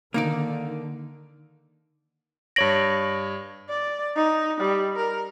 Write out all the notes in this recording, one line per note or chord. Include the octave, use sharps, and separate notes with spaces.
D3 D#3 A#3 D#4 D5
G2 C#5 A#6 D7 F#7
D5
D#4
G3
A#4